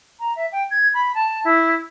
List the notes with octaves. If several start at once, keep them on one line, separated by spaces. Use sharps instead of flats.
A#5
E5
G5
G#6
B5
A5
E4